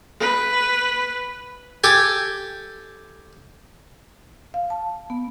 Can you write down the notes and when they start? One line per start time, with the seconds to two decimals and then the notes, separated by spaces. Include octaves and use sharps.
0.20 B4
1.84 G4 A4 G#5
4.54 F5
4.70 A5
5.10 B3